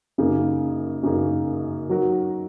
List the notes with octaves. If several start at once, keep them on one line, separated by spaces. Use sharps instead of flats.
F#2 C#3 A#3 D#4 G#4
F#2 C#3 A#3 D#4 G#4
F#3 D#4 F#4 A#4